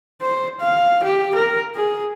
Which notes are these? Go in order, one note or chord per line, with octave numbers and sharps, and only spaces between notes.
C5
F5
G4
A#4
G#4